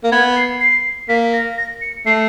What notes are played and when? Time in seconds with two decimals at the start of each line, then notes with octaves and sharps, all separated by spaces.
0.04 A#3
0.12 B3 G#6
0.36 C7
0.61 C7
1.09 A#3 B6
1.33 A#6
1.58 A#6
1.81 C#7
2.06 A3 C7